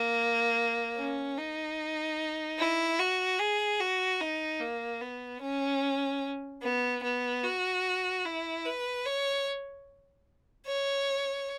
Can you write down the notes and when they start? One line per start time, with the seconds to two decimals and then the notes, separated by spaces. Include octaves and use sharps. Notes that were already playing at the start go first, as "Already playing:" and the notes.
Already playing: A#3
0.96 C#4
1.38 D#4
2.59 E4
2.99 F#4
3.40 G#4
3.80 F#4
4.20 D#4
4.60 A#3
5.01 B3
5.42 C#4
6.62 B3
7.03 B3
7.44 F#4
8.25 E4
8.65 B4
9.05 C#5
10.67 C#5